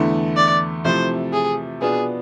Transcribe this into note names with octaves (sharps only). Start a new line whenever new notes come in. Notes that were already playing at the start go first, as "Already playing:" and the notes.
Already playing: E2 D3 A3 E4
D5
C3 F3 A3 E4 C5
G#4
B2 B3 D4 F4 G#4